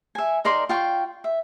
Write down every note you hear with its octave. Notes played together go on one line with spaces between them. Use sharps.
E5 G#5
D#4 A#4 D5 C6
F4 G5 C#6
E5